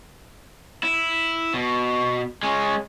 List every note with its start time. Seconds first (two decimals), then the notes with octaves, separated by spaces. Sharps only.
0.83 E4
1.54 B2
2.43 G#3 C#4